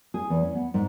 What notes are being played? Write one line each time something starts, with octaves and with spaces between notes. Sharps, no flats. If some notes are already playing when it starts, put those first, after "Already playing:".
G#4
E2
C#4
B3
G#2